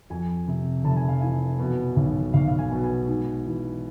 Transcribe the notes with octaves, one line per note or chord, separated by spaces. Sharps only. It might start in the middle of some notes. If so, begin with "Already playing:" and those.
F2 G#5
C3
F1 A5
G#5
F5
E3 G#5
B2
B1
B1 F5
F5
G#5
B2
G#5
G#2
E3